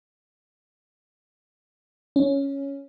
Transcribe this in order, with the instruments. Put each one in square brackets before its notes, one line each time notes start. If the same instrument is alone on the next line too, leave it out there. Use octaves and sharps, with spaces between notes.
[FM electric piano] C#4